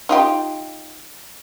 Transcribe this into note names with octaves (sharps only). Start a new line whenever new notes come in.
D#4 F4 G4